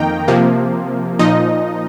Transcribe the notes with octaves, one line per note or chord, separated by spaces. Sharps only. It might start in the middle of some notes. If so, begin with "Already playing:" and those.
Already playing: F2 D#3 A#3 D#4 G5 A#5
C3 F3 A#3
A#2 F3 D#4 D#5